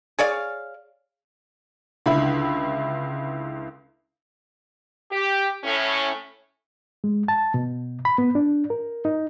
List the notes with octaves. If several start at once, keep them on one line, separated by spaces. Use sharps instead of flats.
G#4 C#5 D5 F5
C#2 D3 E4 B5
G4
A2 C#4
G#3
A5
B2
B5
B3
D4
A#4
D#4